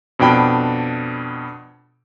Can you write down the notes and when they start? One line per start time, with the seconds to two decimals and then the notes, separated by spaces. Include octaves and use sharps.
0.19 F2 B2 D4 G5 B5